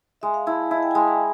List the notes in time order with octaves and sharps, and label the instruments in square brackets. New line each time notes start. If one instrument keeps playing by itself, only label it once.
[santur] G#3 [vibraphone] E5
[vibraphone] F5
[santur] E4 [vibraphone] A5
[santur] E4 [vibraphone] D#5
[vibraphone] G5
G#5
[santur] G#3 [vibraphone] A5
[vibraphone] A#5